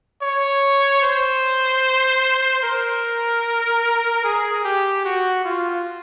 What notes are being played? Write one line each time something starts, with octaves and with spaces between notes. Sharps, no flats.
C#5
C5
A#4
G#4
G4
F#4
F4